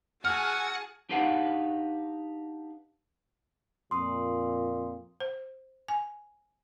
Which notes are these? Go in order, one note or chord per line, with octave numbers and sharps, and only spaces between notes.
E4 F#4 G#4 F#5 G#5 A5 F6
D4 D#4 G4 B4 F5 F#5
F2 A#2 C6 D#6
C5
G#5